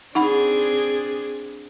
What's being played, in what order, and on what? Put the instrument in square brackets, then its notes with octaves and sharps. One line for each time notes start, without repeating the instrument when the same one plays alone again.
[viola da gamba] C4 D4 G#4 [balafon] D#4 F#5 B5